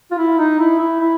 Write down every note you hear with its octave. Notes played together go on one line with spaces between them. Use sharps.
F4
E4
D#4
E4
E4
E4